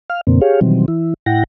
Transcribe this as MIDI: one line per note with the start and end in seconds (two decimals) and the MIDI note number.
0.10 0.21 77
0.10 0.21 89
0.27 0.41 42
0.27 0.41 47
0.27 0.41 50
0.27 0.41 58
0.27 0.41 60
0.41 0.60 67
0.41 0.60 68
0.41 0.60 73
0.41 0.60 77
0.61 0.86 47
0.61 0.86 51
0.61 0.86 52
0.61 0.86 54
0.61 0.86 55
0.61 0.86 60
0.88 1.14 52
0.88 1.14 64
1.26 1.44 45
1.26 1.44 64
1.26 1.44 78
1.26 1.44 79
1.26 1.44 94